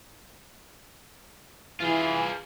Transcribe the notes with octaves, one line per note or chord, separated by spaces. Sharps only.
E3 F4 G#4